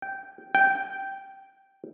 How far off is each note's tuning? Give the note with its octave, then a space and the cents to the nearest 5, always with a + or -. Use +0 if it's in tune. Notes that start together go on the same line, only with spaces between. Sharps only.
G5 -10
G5 -10